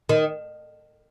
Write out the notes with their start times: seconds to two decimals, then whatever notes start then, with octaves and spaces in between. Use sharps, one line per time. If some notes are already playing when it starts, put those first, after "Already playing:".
0.09 D#3